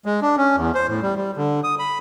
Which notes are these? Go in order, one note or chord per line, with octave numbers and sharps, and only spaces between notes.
G#3
D4
C#4
E2
C5
A2
G3
G3
D3
D#6
B5